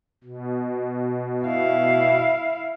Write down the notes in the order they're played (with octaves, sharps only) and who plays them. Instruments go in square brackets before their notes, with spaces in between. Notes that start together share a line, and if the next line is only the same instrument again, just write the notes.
[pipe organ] B2
[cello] E4 F5